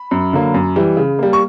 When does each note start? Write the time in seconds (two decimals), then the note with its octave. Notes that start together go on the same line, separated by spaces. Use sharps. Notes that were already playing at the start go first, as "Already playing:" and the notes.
Already playing: B5
0.11 F#2
0.33 D3 F#3 A#3
0.54 F#2
0.76 E3 G3
0.97 C#3
1.19 G3 A#3
1.33 C#6